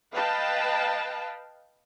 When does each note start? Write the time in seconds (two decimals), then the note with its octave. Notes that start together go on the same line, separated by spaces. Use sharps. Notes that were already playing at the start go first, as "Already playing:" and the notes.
0.14 B4 D#5 F5 G5 A5